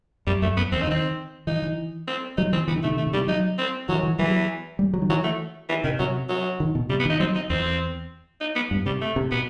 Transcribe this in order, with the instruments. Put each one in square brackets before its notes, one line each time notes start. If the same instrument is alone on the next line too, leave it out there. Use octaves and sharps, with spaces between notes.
[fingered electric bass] F#2 [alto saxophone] G3
[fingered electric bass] F#2 [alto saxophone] A3
[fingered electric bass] F#2 [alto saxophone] B3
[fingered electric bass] E2 [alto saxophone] C4
[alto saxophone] D#4
[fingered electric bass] D#3 [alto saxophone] C4
[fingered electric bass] E3 [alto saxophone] D#4
[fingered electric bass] E3
[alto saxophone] C4
[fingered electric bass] F#3 [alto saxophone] D#4
[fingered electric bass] E3 [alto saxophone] C4
[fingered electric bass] E3 [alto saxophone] B3
[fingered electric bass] D#3
[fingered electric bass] C3 [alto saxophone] A3
[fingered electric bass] D#3
[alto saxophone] A3
[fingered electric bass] C3
[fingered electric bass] D#3 [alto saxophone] G3
[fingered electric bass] E3
[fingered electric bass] F#3 [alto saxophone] D#4
[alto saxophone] C4
[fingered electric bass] E3 [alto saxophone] F#3
[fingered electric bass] E3
[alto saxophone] E3 [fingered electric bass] F#3
[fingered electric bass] G3
F#3
D#3
[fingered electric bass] E3 [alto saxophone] F#3
[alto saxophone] A3
E3
[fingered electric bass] C3 [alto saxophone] D#3
[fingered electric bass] C3 [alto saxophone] F#3
[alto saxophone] F#3
[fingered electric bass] D#3
B2
[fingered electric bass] C3 [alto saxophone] G3
[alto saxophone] B3
[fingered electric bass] D#3
[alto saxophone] D#4
[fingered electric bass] F#3 [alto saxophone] C4
[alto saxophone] D#4
[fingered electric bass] E2 [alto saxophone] C4
[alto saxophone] D#4
B3
[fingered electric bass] G2
[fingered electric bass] C3 [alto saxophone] G3
[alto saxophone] A3
[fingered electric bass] C3
[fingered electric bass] B2 [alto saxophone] B3